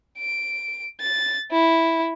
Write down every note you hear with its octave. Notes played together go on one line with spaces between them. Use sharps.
D7
A6
E4